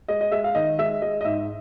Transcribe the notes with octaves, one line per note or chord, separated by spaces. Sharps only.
G#3 D#5
D#5
G#3 E5
F5
D#3 D#5
G#3 E5
G#3 D#5
D#5
G#2 E5